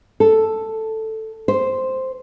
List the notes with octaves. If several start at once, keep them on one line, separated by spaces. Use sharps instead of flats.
A4
C5